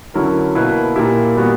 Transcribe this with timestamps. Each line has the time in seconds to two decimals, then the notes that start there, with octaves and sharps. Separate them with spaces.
0.14 D3 F#3 C#4 E4 A#4
0.55 B2 A#3 E4 B4
0.95 A#2 A#3 E4 G4
1.36 A#2 G3 B3 F#4